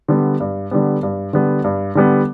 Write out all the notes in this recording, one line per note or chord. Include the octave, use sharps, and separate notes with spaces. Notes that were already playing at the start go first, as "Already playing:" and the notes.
D3 G3 B3
G2
D3 G3 B3
G2
D3 G3 B3
G2
D3 G3 B3